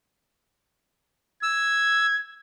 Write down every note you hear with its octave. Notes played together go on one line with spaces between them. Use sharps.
E6 G#6